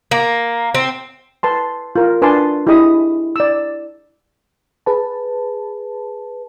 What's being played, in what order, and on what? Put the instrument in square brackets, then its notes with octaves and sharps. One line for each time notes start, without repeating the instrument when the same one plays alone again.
[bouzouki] A#3
C4
[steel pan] B4 A5 C6
F4 A#4
D4 B4 G#5 A5 C6 D6
E4 G4 G#4 D#5 B5 D#6
D5 E6
[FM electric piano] G#4 B4 A5